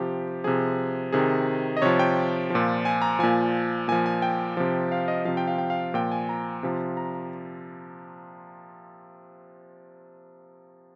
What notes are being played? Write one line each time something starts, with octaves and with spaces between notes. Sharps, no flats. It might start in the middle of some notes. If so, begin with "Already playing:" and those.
Already playing: C3 F3 G4
C3 F3 G#4
C3 D#3 G#4
D#5
C3 F3 C#5
G5
A#2 F3
G#5
A#5
A#2 F3 G#5
A#2 F3 G#5
G#5
G5
C3 F3
F5
D#5
C3 F3 F5
G5
F5
G5
F5
A#2 F3 G5
G#5
A#5
C3 F3
A#5